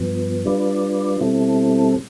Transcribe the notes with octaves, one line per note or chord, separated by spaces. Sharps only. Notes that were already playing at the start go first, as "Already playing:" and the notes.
Already playing: G2 F3 B3
G3 D4 F4 B4 D5
B2 G3 C4 E4 A4